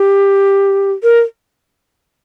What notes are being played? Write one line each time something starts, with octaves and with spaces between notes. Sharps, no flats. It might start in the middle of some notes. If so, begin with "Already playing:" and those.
Already playing: G4
A#4